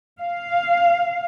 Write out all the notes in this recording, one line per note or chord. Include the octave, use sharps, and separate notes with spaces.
F5